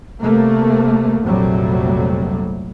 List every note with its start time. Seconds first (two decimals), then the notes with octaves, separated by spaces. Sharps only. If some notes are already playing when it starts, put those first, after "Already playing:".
0.21 C3 G3 A3 A#3
1.22 A#1 F2 C3 F#3 G3 A3